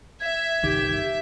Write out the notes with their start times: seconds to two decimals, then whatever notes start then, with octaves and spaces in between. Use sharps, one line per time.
0.20 E5 G#6
0.63 G1 C2 D#3 G4